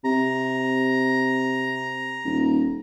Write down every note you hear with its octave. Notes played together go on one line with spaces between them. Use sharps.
C3 A#5
D#1